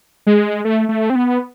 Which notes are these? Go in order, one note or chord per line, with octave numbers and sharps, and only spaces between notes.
G#3
A3
A3
C4
B3